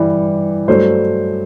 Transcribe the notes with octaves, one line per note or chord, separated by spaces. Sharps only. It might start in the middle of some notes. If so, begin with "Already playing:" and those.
Already playing: G2 E3 G3
G2 F#3 A3 C5